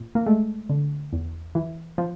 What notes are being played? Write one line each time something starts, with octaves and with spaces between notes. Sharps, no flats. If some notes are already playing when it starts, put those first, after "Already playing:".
Already playing: A#2
A#3
G#3 A3
D3
E2
E3
F3